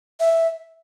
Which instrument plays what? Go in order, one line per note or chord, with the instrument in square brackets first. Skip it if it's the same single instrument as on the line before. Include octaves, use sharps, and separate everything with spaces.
[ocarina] E5